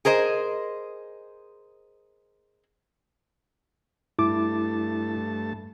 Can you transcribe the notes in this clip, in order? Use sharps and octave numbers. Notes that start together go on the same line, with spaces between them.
G#4 A#4 C5 D#5
G2 A3 E4 A5 D6